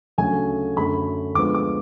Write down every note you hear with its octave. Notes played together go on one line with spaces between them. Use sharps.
D2 C#3 F#3 A3 G#5
F#2 D3 F#3 A3 B5
D2 D3 F3 G#3 B3 D6
D6